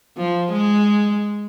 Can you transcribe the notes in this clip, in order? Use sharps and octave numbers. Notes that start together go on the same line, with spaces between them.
F3
G#3